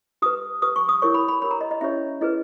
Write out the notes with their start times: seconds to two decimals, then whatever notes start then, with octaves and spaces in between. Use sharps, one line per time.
0.22 G4 B4 D#6
0.62 G4 B4 D#6
0.76 C#6
0.89 D#6
1.02 E4 G4 A#4 C#5 C#6
1.14 B5
1.28 B5
1.41 G4 A#4 C#5 B5
1.51 A#5
1.61 D#5
1.71 D#5
1.81 C#4 E4 G4 C#5 E5
2.21 E4 G#4 B4 D#5